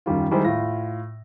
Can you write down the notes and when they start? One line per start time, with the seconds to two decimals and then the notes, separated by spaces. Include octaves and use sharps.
0.06 F#2 D#3 G3 F4
0.31 D#3 G3 G#3 D#4 E4 C5
0.44 A2 F4 A#6